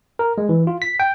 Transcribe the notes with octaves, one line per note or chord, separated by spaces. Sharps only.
A#4
G#3
E3
F4
B6
G5